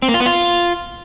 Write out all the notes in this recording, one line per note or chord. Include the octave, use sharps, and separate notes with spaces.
C4
A#3
F4
B3
F4